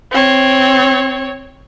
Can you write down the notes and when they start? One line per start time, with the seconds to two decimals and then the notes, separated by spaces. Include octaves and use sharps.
0.12 C4 C#5